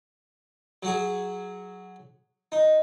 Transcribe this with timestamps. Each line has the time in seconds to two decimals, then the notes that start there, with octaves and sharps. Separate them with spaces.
0.83 F#3 F#4 G#4
2.52 D#4